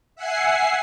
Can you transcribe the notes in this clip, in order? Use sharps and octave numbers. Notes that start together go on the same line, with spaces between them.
E5 F#5 G#5 C7